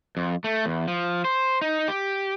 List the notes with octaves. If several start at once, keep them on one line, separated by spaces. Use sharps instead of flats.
F2
A3
E2
F3
C5
D#4
G4